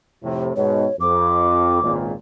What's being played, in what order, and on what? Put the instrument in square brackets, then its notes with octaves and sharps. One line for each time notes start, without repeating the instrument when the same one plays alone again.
[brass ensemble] F2 A2 C3
[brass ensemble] G#2 B2 [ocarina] C#5
[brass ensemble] F2 [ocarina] D6
[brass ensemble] G#1 C#2 A#2